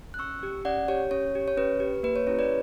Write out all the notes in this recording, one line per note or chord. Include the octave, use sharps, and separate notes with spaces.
F#6
C#4 C#6 E6
G4
C#4 D5 F#5
G4 C#5
C#4 C#5
G4
C#5
C#4 B4
G4
A#3 B4
C#5
C#4 E4 G4 C#5
B4 D5